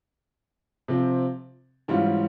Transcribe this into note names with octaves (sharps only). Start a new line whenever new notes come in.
C3 F3 C4
G#2 E3 G3 C#4 F4